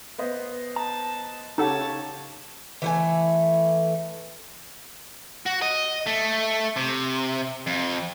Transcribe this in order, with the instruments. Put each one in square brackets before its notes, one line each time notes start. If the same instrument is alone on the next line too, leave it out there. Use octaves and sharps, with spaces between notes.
[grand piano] B3 C5 D#5
[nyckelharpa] A5 [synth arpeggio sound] A#5
[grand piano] C#3 G4 [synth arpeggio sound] D#4 A4 F#5 [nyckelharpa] C#5 A5
[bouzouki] E3 A3 G#5
[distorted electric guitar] F#4
D#5
A3
C3
F2